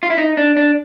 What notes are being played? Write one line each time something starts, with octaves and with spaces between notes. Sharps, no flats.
F4
E4
D#4
D4
D4